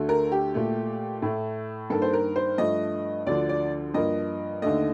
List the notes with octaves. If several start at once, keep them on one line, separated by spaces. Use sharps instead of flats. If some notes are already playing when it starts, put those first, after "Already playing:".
Already playing: D2 D3 A3
A#4
G4
A#2 A3
A2 A3
G2 D#3 A#3 A4
C5
A#4
C5
G2 F3 A3 D#5
D2 D3 F3 D5
D5
G2 F3 A#3 D#5
D#2 D3 A3 D#5